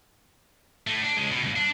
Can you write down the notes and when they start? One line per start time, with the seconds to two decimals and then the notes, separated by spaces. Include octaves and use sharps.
0.87 A2 A3
1.02 D4
1.17 C#2 G#3
1.30 B2
1.42 C#2 G2
1.56 D4